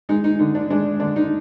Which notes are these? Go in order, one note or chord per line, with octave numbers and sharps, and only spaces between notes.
G#3 D#4
D#4
D3 D#4
D4
G#3 D4
D3 D4
D#4